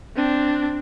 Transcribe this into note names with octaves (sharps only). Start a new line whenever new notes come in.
C4 D4